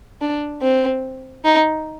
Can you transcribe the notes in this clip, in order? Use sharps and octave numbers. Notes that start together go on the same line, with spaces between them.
D4
C4
D#4